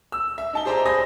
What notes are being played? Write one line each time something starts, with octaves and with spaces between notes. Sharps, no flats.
E6
E5
D#4 A5 G7
G4 G#4 C5 D5 A#5
C5 G#5 B5 D#6 A#6